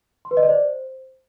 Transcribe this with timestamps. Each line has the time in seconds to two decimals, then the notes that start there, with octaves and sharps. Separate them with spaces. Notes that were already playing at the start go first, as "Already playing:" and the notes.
0.25 C6
0.31 B4
0.37 D#5
0.43 D5
0.49 C5